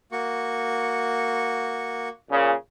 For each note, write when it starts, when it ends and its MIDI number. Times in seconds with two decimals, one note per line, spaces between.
0.12 2.09 58
0.12 2.09 66
0.12 2.09 85
2.31 2.54 46
2.31 2.54 49